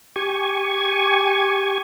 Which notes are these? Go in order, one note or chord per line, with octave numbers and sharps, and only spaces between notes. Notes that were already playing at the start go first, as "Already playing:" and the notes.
G4 G#5 C#6